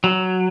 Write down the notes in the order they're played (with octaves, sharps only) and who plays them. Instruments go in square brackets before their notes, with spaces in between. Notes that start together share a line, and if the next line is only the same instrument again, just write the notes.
[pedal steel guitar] F#3